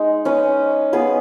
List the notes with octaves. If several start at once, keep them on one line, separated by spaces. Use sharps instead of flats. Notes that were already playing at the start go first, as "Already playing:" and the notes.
Already playing: G#3 D#4
C#4 B4 D#5
B3 G#4 B4